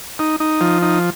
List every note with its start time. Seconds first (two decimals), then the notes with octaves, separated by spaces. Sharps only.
0.19 D#4
0.40 D#4
0.61 F3
0.82 D#4